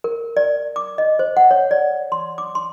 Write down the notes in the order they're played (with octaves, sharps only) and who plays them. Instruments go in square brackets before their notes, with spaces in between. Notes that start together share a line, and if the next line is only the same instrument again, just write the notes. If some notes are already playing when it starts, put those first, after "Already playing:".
[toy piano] A#4
D5
D6
D#5
C5
F#5
C#5
D5
C6
D6
C6